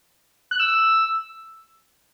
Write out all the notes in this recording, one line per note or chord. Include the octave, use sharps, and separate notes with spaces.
F#6
E6